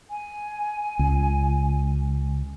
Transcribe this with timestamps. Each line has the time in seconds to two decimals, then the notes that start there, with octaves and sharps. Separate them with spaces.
0.10 G#5
0.99 C#2